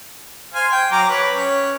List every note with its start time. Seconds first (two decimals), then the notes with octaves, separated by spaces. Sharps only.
0.54 C5 F5 G#5
0.72 G5
0.92 F#3 A#5 D6
1.10 B4 C#5
1.32 C#4